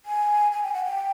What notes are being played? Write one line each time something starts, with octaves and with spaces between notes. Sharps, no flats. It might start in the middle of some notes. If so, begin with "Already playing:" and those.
G#5
G#5
G5
F#5
G5